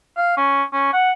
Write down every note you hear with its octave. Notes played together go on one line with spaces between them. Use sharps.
F5
C#4
C#4
F#5